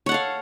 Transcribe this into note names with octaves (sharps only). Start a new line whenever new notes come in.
A4 C#5 F5 F#5